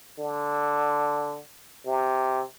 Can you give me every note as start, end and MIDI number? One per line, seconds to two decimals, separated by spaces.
0.19 1.38 50
1.86 2.43 48